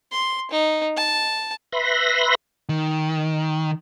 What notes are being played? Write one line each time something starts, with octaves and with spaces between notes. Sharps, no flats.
C6
D#4
A5
B4 E5 B5 C6 A#6
D#3